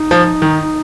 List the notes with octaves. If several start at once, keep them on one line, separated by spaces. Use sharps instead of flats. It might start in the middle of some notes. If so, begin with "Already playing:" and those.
Already playing: D#4
F3
D#3